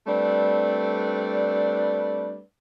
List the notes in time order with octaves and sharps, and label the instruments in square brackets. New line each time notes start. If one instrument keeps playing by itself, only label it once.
[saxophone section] G3 A3 C4 D4 B4 D5